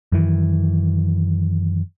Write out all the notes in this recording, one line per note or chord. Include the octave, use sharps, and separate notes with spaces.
F#2 D#3 E3